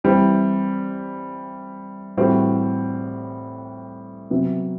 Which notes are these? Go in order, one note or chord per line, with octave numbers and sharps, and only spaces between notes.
E3 G3 C4
A2 E3 G3 C4 F#4
C3 F#3 B3